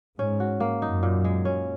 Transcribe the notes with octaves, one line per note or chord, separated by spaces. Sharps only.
G#2 C#4
F#4
A#3
F#2 D#4
A#2
G#3
C#4